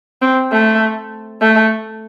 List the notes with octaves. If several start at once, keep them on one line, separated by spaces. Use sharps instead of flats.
C4
A3
A3